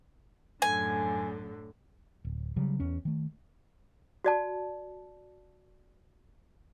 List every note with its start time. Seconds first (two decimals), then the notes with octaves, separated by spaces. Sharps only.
0.62 F#2 A2 D3 G#5
2.25 D1
2.56 C#3 F#3 G3
2.80 E2 C#4
3.05 D#3 A3
4.24 F#4 D5 A5